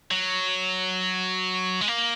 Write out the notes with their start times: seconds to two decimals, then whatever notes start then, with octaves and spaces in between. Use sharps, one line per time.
0.11 F#3
1.81 G#3
1.88 A#3